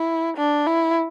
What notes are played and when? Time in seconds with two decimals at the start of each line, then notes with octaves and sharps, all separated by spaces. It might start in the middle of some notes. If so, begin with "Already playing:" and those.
Already playing: E4
0.37 D4
0.67 E4